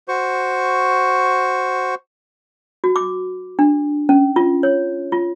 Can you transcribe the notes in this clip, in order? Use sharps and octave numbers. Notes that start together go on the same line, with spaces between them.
F#4 C5 C#6
F#4
D6
D4
C#4
F4
C#5
F4